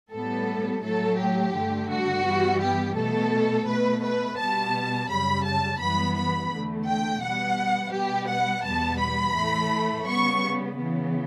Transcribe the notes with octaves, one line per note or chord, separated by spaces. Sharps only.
A2 G3 B3 A4
A2 F#3 A3 A4
G4
G2 D3 A3
F#4
G2 E3 G3 B3
G4
B2 A3 A4
B2 A3 B4
B4
B2 G3 B3 A5
F#2 C#3 G3 B5
A5
F#2 E3 G3 B3 B5
B5
E2 D3 A3
G5
B2 G3 B3 F#5
B2 G3 B3 G4
F#5
E2 B2 G3 B3 A5
B5
A2 E3 A3
C#3 G3 B3 C#6
C#3 E3 B3